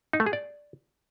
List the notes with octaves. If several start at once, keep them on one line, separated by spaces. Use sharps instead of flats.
D#4
A3
G#4
D5